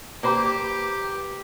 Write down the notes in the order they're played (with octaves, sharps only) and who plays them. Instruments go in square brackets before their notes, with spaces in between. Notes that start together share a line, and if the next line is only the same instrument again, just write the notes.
[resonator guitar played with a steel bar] A#3 B4 C5 [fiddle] G4